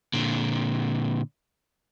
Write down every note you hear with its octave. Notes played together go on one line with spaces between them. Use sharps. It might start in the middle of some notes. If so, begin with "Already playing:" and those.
A#2 D3